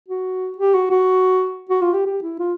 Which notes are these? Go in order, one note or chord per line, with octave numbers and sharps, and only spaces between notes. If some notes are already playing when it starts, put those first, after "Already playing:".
F#4
G4
F#4
F#4
F#4
F4
G4
G4
E4
F4